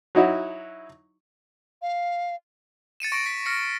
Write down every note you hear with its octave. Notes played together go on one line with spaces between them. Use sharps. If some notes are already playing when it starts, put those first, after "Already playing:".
F#3 D#4 E4 F#4
F5
A6 C#7 D#7 E7
C#6 A#6 D7
B6
F6 A#6 C#7